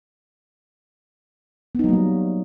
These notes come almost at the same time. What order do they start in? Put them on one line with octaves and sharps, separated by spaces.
B3 D#4 F#3 A#3 G3